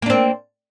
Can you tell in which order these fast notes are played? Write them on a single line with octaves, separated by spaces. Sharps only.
A#3 D4 C4